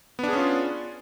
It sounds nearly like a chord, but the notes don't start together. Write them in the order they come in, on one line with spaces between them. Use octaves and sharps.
B3 D4 G#4 C#4 F4